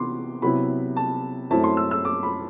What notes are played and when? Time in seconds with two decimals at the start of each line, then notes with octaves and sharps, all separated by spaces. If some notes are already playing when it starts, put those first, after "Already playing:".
Already playing: C3 E3 B3 C6 D6
0.42 C3 F#3 B3 E4 B5
0.97 A5
1.51 F#2 F#3 A3 C4 E4 A5
1.64 C6
1.77 E6
1.91 E6
2.05 D6
2.23 B5